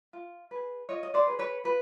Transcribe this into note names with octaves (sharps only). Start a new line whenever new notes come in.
F4
G#4 B4
F4 C#5 D#5
D#5
C5 D5
G#4 B4
B4 C#5
F4 B4